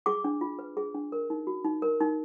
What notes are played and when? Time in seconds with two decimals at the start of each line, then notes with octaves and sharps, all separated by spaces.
0.06 G#4 D6
0.24 D4
0.41 F4
0.59 B4
0.77 G#4
0.94 D4
1.12 A#4
1.30 D#4
1.47 F#4
1.65 D#4
1.82 A#4
2.01 D#4